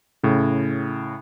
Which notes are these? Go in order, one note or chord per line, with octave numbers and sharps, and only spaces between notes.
A2 C#3